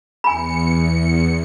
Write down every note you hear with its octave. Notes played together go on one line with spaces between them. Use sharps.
E2 G#5 B5 C#7